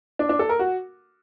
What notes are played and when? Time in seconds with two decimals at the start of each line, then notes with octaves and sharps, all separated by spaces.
0.19 D4
0.29 D4
0.39 A4
0.49 A#4
0.59 F#4